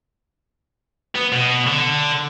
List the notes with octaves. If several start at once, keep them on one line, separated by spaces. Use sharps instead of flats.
B3
B2
D3